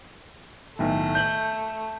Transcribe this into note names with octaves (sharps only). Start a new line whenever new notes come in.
B1 A2 D#3 A3
G6 F#7